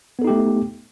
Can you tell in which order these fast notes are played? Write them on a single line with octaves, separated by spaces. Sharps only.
B3 A4 D#4 G4 A3